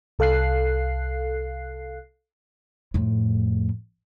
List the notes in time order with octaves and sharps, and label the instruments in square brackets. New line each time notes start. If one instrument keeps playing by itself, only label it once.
[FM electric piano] C2 A4 F5 F#6 C7
[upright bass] F2 A2